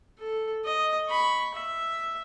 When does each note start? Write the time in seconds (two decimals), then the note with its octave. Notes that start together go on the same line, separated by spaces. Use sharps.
0.19 A4
0.65 D#5
1.09 B5 C#6
1.55 E5